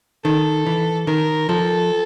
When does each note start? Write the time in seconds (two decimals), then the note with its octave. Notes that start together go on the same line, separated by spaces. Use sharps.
0.25 D#3 A4
0.66 E3
1.07 D#3 A#4
1.49 F3 A4